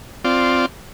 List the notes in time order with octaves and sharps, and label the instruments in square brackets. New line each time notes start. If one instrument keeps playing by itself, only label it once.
[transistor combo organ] C4 F4 D5